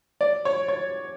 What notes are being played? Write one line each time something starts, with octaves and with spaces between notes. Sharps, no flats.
D5
C#5
C#5